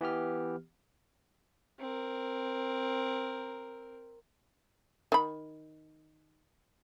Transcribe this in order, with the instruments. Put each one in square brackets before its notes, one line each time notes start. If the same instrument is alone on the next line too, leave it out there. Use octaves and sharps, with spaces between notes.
[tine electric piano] E3 B3 G4 F6
[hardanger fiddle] C4 A#4
[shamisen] D#3 B5